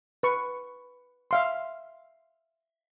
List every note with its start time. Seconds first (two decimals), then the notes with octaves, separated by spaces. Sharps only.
0.23 B4 C#6
1.31 E5 F5 C6